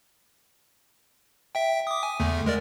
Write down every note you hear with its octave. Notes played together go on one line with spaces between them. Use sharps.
E5 G5
D6 D#6
G#5
E2 D3 A3
G#3 A#4 D5